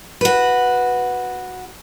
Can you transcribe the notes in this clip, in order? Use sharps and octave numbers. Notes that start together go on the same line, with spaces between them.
F#4 B4